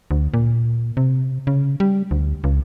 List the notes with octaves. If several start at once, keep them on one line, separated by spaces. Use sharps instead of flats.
D2
A#2
C3
C#3
G3
D2
C#2